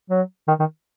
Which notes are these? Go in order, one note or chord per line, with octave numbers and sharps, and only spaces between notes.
F#3
D#3
D#3